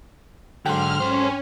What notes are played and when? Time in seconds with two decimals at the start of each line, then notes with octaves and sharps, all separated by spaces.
0.66 G#2 D3 F#3 G5 C6 F6
1.00 C#4 A4 C5